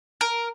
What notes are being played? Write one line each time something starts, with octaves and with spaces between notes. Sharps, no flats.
A#4